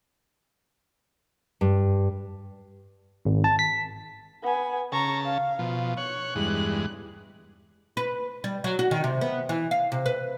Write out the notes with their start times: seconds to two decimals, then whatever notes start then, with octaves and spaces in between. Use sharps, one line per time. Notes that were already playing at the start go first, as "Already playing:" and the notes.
1.61 G2
3.25 G#1
3.44 A5
3.59 B6
4.43 B3 G#5
4.92 C#3 A5 A#5 C#6
5.23 F5
5.59 B2 F3
5.98 C#5 F#6
6.35 E2 G2 G#3
7.97 B4
8.44 G3
8.64 F#3
8.79 F#4
8.91 D#3
9.04 C3
9.21 B3
9.49 E3
9.71 F5
9.92 C3
10.06 B4